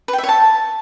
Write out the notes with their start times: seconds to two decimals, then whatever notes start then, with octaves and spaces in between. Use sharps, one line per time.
0.08 B4
0.13 G5
0.18 E5
0.23 C#5
0.29 A5